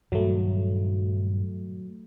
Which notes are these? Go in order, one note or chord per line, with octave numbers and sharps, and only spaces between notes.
G2 A#2 D#3 F#3 A3